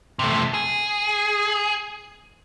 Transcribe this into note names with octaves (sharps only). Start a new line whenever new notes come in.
C3 A3
G#4